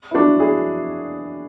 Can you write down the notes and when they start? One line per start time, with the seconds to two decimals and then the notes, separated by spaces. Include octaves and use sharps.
0.11 E4
0.15 D4 F#4
0.39 E4 G#4